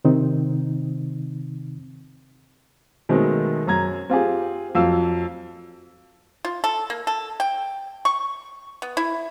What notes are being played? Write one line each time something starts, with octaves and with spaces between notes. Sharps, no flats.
C3 D#3 C4 D#4
B2 D#3 F#3 G#3 A3 C4
F#2 A#5 G#6
C4 F4 G4 G#4
F2 F#3 F5 E6
F4
A4
A#3
A4
G5
C#6
B3
E4